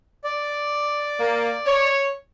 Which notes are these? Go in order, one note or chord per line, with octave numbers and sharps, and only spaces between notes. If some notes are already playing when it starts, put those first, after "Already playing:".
D5
A#3
C#5